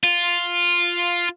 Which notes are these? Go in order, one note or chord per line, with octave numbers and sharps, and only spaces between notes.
F4